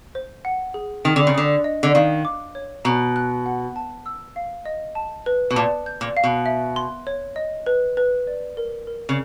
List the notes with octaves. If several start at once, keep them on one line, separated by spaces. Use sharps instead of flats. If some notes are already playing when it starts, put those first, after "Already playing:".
C5
F#5
G#4
D#3 G5
D3
C#3
D3 D#6
D#5
D3
D#3 F5
D6
C#5
B2 A#5
F#6
F#5
A5
E6
F5
D#5
A5
B4
B2
A#2 A5
G6
A#2
F5
B2
E5
C6
C#5
D#5
B4
B4
D5
A#4
A#4
C#3